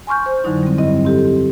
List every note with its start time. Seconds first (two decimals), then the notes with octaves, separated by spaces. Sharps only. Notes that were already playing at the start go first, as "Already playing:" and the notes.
0.07 G#5 C6 C#6 F6 G6
0.26 C5
0.44 F2 D3 F#3 D#4 E4
0.63 G3 C4
0.78 G2 C4 E4 D#5
1.05 C4 G4 A4